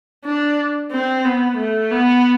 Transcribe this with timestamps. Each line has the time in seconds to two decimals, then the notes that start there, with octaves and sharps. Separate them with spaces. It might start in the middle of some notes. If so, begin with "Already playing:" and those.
0.24 D4
0.91 C4
1.24 B3
1.57 A3
1.91 B3